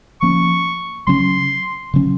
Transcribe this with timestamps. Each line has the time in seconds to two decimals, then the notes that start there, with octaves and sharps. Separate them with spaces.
0.21 F3 A#3 C#4 C#6
1.07 C#3 F#3 C#4 C6
1.94 C#3 F#3 C#4